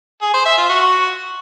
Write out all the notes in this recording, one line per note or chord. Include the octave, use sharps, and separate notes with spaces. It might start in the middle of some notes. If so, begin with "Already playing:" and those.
G#4
C5
E5
F4
F#4